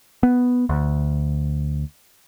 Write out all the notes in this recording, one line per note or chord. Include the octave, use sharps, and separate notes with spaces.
B3
D2